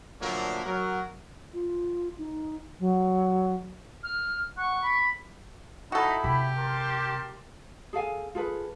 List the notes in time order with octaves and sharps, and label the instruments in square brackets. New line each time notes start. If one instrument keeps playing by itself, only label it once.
[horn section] A#2 D3 F3 F#3 A3 A#3
F#3 A#4
[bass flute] F4
D#4
F#3
[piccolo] F6
[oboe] F#5 [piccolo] C#6
[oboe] B5
[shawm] D#4 [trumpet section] E4 B5 [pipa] F#4 A4
[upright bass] C3 [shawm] G4
[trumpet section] A#4 A5 C6
[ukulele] G#4 A4 F5 G#5
F4 G#4 A4 B4